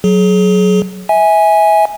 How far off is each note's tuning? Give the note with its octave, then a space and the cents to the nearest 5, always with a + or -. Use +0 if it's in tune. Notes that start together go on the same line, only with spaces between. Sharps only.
F#3 +0 G#4 +30
E5 -25 G#5 +0